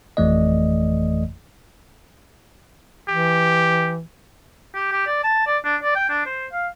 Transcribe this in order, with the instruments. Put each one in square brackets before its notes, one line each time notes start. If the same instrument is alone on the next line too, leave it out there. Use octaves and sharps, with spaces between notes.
[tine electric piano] G#1 F2 E3 A3 D5 D#5
[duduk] E3 [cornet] G4
[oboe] G4
G4
D5
A5
D5
D4
D5
G5
D4
C5
F5